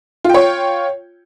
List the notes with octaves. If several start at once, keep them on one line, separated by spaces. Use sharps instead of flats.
F4 C#5 G5